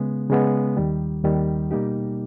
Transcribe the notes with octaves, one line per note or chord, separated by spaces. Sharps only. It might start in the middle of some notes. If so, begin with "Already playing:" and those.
Already playing: C#3 G#3 B3
C#3 G#3 B3
D#2 D#3 G3
D#2 D#3 G3
B2 G3 A#3 D#4 G4